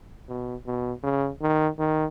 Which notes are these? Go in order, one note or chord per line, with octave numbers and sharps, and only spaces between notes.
B2
B2
C#3
D#3
D#3